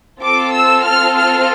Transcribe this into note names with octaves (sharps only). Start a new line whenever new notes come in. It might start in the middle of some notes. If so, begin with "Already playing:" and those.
C4 F4 A4 D6
E6
F6
F6